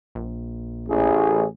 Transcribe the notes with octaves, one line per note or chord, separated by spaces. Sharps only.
A#1
A1 G#4